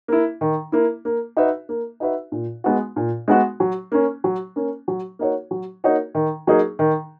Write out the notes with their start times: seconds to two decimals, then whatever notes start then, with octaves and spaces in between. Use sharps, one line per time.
0.08 A#3 E4
0.41 D#3
0.72 A#3 E4
1.05 A#3
1.37 D#4 F#4 B4 E5
1.69 A#3
2.00 D#4 F#4 B4 E5
2.32 A#2
2.64 G#3 B3 F#4
2.96 A#2
3.28 G#3 B3 F#4
3.60 F#3
3.92 A#3 C#4
4.24 F#3
4.56 A#3 C#4
4.88 F#3
5.19 A#3 D#4 F#4 C#5
5.51 F#3
5.84 A#3 D#4 F#4 C#5
6.15 D#3
6.47 F#3 A#3 D#4 G#4
6.79 D#3